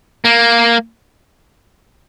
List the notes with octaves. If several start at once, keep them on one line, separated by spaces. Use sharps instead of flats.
A#3